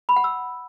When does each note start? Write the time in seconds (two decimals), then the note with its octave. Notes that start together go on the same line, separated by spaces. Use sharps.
0.09 B5
0.16 F#5
0.24 E6